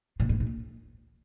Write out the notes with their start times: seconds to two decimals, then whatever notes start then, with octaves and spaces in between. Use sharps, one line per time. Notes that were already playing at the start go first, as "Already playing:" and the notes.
0.20 A#2
0.29 A2
0.40 A#2